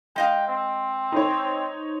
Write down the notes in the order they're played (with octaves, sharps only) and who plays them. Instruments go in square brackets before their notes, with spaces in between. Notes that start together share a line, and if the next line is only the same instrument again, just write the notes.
[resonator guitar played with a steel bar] G#3 D#5 F5 [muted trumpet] G5
[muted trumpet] C4
[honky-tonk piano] D#4 C5 C#5